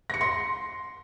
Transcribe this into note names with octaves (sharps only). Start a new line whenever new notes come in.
A#6 C#7
C6